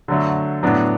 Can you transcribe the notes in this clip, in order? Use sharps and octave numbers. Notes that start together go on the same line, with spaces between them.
D3 F#3 A3
A2 F#3 B3 D4